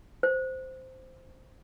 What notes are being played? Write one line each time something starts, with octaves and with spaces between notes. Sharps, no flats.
C5